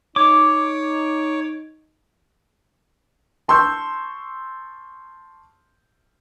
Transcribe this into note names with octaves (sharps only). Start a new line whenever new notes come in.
D#4 C#5 D6
A5 C6 C#6 E6 G6